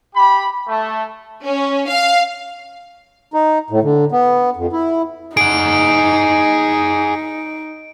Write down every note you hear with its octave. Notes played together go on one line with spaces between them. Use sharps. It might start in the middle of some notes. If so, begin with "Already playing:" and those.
G4 B5
A3
C#4
F5
D#4
A2
D3
B3
F2
E4
D#4 G#4 F#5 D7